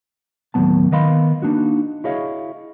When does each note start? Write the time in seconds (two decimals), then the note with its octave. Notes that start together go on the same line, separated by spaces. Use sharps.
0.54 D#2 A2 E3 F#3 B3 A5
0.91 D#3 B3 D#5 F5 B5 C6
1.42 A#3 D4 D#4 F#4
2.04 E4 F#4 G#4 C#5 D#5 F5